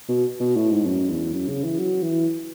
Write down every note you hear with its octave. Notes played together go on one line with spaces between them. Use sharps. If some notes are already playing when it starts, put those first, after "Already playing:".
B2
B2
A2
G#2
F#2
E2
F#2
C#3
E3
F#3
E3